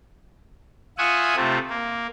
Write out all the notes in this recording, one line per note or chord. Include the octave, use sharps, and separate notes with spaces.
F4 E5 F#5 G#5 C#6 D#6
C3 A3 C4 F4
A#3